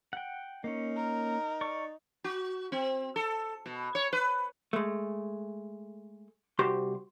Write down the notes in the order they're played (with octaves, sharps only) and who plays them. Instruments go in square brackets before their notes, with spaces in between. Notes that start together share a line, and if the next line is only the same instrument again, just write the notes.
[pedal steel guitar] F#5 G5
[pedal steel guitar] A#3 C#4 [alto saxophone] D#4
[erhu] A#4
[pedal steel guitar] D5 C#6
[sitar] F#4
C4
A4
B2
C#5
B4
[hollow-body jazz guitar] G#3 A3
C2 F#4 G4 C5 C6